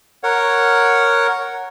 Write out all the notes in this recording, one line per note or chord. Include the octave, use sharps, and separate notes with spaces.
A#4 C#5 F#5